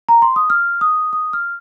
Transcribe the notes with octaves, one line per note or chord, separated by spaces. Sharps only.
A#5
C6
D#6
F6
D#6
D#6
F6